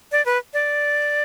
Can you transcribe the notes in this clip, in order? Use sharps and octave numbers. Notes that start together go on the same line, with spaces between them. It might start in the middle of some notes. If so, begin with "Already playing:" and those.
D5
B4
D5